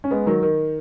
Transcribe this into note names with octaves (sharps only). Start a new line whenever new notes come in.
C#4
G#3 B3
D#3 F#3
D#3